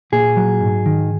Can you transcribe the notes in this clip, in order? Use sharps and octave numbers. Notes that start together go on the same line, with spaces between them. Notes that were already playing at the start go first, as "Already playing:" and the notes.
A#2 G#4
F#3
G#2
D#3